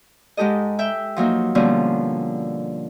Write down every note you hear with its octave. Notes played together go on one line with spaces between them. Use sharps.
G#2 G#3 G4 A4 D#5
E5 G5
F3 F#3 A#3 D#4
B2 D3 F3 G3 A#3 C#4